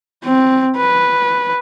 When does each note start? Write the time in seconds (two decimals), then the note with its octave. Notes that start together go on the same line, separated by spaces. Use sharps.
0.24 C4
0.77 B4